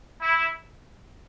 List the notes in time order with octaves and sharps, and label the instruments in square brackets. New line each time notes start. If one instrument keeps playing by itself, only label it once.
[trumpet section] E4